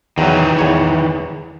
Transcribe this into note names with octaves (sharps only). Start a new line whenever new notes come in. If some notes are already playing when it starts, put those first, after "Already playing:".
E2 D#3 E3 F#3
E2 C#5